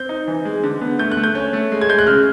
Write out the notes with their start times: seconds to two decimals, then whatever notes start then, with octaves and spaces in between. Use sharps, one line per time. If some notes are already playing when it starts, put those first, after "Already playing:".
Already playing: C4 G6
0.09 D#4
0.28 E3
0.45 G#3
0.64 D3
0.81 B3
0.99 A3 G6
1.12 F#6
1.17 A3
1.24 G6
1.35 C#4
1.53 A3
1.72 G#3
1.81 G#6
1.89 G#3 G6
1.99 F#6
2.07 C#3 F6